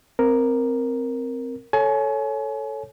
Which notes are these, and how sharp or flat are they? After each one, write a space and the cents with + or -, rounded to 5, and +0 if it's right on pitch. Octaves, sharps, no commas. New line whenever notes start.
C4 +0 A#4 +0
A4 +0 C#5 +0 G#5 +30